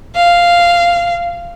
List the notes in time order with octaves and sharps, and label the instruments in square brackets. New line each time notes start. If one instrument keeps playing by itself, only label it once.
[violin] F5